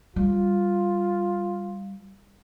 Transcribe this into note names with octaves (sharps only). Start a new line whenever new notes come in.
G3 F4